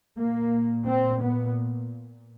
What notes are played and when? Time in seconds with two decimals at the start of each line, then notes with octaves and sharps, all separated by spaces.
0.19 A#2 A#3
0.87 C4
1.21 B3